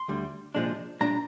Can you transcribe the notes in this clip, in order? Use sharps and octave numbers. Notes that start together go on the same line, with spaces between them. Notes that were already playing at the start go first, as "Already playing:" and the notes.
Already playing: C6
D2 D3 G3
C2 A#2 F3 G#3 D4
A#2 G3 D4 A#5